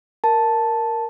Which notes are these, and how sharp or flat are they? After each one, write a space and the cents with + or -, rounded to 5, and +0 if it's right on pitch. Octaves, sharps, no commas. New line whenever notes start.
A#4 +0 A5 +0